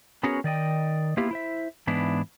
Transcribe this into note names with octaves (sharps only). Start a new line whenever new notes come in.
B3 C#4 F#4 G#4 A#4 C#5
D#3 D5 D#5 G5
A#3 B3 E4 F4 G4
E4 C5 E5
G#2 E3 B3 D4 E4